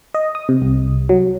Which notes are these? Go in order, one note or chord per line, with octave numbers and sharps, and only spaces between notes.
D#5
D#6
C3
C2
F#3